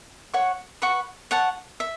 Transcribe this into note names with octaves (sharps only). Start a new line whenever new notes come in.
C#5 F#5 C#6
B4 F#5 C#6
C#5 F#5 A5
E5